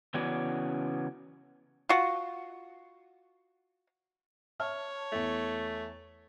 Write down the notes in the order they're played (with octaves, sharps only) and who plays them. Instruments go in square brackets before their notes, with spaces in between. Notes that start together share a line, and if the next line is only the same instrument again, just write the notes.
[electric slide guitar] C#3 E3 B3 C#4 F#4 D5
[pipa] F4 F#4
[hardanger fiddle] C#5 [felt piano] E5 A5 F6
[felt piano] E2 E4 [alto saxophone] A3